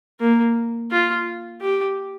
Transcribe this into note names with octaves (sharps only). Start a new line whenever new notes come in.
A#3
F4
G4